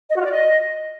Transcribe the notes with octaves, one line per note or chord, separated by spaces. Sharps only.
D#5
F#4
F4
D5
D#5